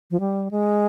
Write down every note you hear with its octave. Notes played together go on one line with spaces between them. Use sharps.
F3
G3
G#3